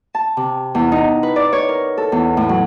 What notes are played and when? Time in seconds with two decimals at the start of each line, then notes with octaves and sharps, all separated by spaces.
0.15 A5
0.37 C3
0.75 E2
0.92 D#4
1.23 B4
1.36 D5
1.53 C#5
1.69 A#4
1.98 A4
2.12 E2
2.37 A2
2.49 F#3